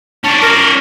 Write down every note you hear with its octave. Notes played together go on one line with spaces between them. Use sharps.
C#4 D5 A5
A#4